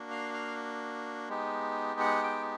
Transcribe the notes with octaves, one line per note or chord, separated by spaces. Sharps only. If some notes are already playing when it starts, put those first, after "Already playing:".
Already playing: A#3 D4 F#4
F5
F5
G#3 B3 D#4 G4
F#5
G5